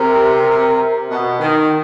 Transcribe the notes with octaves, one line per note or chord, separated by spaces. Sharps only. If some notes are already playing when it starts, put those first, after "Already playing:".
Already playing: C3 A#4
C3
B2
D#3